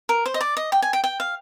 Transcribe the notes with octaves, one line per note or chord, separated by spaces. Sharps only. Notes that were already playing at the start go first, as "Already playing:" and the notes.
A#4
C5
D#5
D5
D#5
G5
G#5
G5
G5
F5